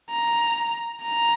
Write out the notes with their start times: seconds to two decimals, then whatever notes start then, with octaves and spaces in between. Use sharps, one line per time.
0.10 A#5
1.02 A#5